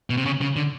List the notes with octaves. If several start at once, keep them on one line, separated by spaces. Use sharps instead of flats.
B2
C3
C#3
C#3
D3